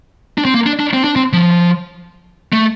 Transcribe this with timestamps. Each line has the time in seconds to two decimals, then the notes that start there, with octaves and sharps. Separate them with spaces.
0.38 D4
0.45 C4
0.54 A#3
0.66 D4
0.80 D4
0.93 C4
1.04 D4
1.16 C4
1.33 F3
2.53 A3